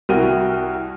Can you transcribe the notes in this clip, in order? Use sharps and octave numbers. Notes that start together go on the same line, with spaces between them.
C2 E4 F#4 A#4 G5 D#7